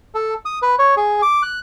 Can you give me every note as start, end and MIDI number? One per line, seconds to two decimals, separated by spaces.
0.15 0.34 69
0.45 0.59 87
0.62 0.75 71
0.79 0.95 73
0.97 1.22 68
1.22 1.42 86
1.42 1.60 90